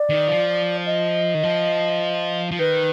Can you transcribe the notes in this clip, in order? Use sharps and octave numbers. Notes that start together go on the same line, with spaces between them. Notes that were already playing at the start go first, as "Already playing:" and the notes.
Already playing: D5
D#3
F3
D#5
D#3
F3
F3
D#3 B4